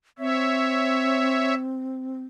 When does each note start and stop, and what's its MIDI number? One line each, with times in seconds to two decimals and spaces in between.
0.18 2.22 60
0.18 1.54 73
0.18 1.54 76